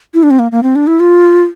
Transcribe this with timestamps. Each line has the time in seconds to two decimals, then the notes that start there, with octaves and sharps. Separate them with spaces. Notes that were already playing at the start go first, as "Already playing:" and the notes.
0.14 E4
0.23 D4
0.31 C4
0.39 A#3
0.52 A#3
0.63 C4
0.76 D4
0.87 E4
1.00 F4